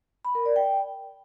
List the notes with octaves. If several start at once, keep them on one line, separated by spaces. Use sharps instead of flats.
B5
A#4
D5
G5